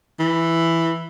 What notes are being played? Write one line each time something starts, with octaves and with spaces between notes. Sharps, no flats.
E3